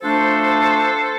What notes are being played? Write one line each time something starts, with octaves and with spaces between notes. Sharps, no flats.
F3 A3 D4 A4 C5